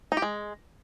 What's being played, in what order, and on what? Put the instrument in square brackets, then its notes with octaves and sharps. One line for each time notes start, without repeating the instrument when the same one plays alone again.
[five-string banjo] D#4
G4
G#3